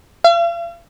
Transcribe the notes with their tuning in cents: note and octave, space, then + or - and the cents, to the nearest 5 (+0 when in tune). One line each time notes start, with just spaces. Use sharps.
F5 -45